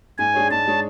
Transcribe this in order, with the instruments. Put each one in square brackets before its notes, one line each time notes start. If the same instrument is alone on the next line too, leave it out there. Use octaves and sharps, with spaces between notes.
[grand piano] G#2 [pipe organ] G#5
[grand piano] G#3 D4 G#4 C#5
[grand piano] G#2 [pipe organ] A5
[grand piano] G#3 D4 G#4 C#5